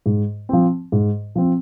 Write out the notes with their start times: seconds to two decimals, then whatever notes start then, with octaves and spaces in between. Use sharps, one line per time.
0.06 G#2
0.49 F3 C4
0.92 G#2
1.36 F3 C4